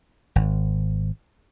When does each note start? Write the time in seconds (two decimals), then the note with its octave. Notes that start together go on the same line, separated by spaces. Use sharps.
0.36 G#1